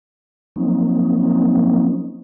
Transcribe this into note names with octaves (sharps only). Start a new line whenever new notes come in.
F3 F#3 A#3 C4 C#4 D#4